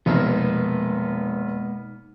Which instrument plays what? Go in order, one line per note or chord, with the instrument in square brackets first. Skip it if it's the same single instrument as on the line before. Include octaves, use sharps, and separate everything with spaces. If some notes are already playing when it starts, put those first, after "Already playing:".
[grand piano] F1 [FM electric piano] B2 D#4 F6 [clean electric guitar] G#3 A#3 B3